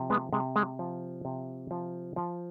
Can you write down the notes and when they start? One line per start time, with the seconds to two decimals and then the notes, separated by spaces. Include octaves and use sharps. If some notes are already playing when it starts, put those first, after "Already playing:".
Already playing: C3 F3
0.10 G#3 B3
0.33 C3 G#3
0.56 G#3
0.79 F3
1.25 C3
1.71 F3
2.16 F3